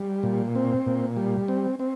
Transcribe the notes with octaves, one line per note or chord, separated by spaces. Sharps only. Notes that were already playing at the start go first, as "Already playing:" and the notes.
Already playing: G3
A#2
C4
A#2
G3
C4
C4